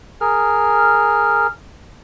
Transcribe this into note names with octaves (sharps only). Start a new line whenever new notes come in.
G#4 A#4 F6